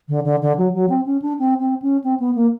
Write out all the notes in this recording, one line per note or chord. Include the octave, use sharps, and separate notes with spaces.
D3
D3
D3
F#3
F#3
C4
C#4
D4
C4
C4
C#4
C4
B3
A#3